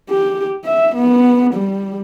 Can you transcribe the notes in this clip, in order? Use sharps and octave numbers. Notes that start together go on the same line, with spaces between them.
G4
E5
B3
G3